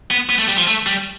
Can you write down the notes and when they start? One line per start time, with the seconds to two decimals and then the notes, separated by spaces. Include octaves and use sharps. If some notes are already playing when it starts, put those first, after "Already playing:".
0.10 B3
0.29 B3
0.38 A3
0.48 G3
0.57 F3
0.67 A3
0.86 G3